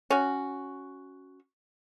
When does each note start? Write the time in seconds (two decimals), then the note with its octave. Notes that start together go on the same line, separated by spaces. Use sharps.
0.10 C#4 F#4